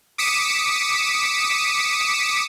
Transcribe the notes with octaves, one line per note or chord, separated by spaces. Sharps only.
D6 D#6 B6 C#7 D#7 E7